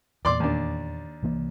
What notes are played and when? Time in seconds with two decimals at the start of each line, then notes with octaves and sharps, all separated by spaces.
0.25 E2 A#2 D5 C6 D6
0.40 D#2 D4
1.23 C2 E3 A#3